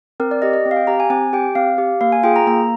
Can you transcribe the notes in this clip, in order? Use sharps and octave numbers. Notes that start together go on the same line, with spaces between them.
C4 A#4
D5
G4 D#5
D#5
C4
F5
G5
G4 A#5
G#5
C4 G#5
G4 G5
C4 F5
G4
A#3 F5
G#5
F4 G#4 G5
A#5
A#3 A#5